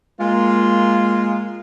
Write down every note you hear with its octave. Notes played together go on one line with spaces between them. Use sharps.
G#3 A#3 F4